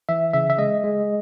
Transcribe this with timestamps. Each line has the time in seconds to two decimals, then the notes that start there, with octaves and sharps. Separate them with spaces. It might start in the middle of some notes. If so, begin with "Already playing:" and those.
0.09 E3 E5
0.34 C#3 E5
0.50 E5
0.58 G#3 D#5
0.84 G#3